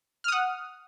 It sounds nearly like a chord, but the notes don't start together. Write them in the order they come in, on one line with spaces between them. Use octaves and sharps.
F6 D#6 F#5